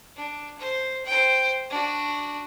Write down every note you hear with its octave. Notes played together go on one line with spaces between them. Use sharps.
D4
C5
C5 G5
D4 F#4